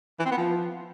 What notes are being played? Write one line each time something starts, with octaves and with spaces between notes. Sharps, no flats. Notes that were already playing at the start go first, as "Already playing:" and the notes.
E3
C4
B3
F3